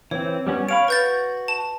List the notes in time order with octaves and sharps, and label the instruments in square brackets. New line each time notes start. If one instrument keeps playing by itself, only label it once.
[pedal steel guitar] E3 C4 [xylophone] C#5
[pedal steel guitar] G3 B3 C#4
[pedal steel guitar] C#5 F5 B5 [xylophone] D7
[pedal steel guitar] F#4 [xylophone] B4 G6 A6
[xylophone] A5